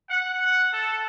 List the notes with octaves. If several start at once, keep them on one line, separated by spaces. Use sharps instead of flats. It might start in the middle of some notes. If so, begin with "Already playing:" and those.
F#5
A4